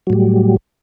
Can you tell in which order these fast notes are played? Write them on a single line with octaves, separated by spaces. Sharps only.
F#3 A2 G3